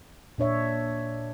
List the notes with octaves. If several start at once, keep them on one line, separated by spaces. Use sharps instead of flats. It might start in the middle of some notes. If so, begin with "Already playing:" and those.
A#2 D4 C#5 E5